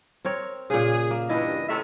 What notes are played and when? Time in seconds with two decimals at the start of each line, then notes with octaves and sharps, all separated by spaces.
0.25 C4 A#4 C#5
0.70 A#2 C#3 G#4
1.11 A#3
1.29 G2 E3 E4 D#5
1.68 A2 C3 A3 E5